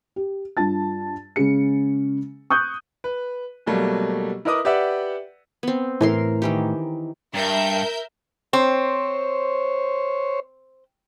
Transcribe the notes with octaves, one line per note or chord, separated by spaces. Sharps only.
G4
G2 F4 A5 A6
C#3 G#3 C#4 G#4 C#7
C#6 D#6 F#6 G6
B4
B2 F#3 G3 A3 A#3
E4 A#4 B4 D#5 D6 D#6
G4 B4 D5 E5 F#5
B3 C4
A2 E3 A#4 C6
D#3 E3 G4
G2 A#4 E5 G6
C4 C5 C#5